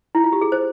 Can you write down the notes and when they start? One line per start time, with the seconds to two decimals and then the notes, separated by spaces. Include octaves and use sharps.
0.15 E4
0.24 F4
0.33 G4
0.41 G#4
0.52 C5